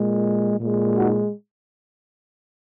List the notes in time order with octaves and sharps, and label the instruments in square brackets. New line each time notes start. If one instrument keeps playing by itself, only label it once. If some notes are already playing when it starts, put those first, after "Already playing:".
Already playing: [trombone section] A#2 G#3
A#2 G#3
D#4 F#4